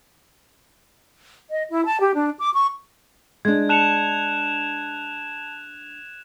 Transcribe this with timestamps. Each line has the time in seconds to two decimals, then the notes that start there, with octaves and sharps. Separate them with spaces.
1.50 D#5
1.69 E4
1.86 A5
2.00 G4
2.14 D4
2.37 D6
2.52 C#6
3.45 G#3 D4 G#6
3.69 A5 F#6 C#7 E7 F7